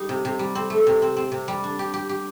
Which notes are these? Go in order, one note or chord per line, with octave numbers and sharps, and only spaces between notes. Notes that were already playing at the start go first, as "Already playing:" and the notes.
Already playing: G3 D#4
C3
C3
G3
C4
A3
C3
C4
C4
C3
G3
D4
G4
G4
G4